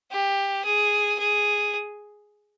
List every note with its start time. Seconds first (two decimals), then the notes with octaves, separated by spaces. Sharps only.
0.12 G4
0.65 G#4
1.19 G#4